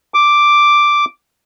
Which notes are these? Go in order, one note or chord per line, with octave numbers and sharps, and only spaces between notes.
D6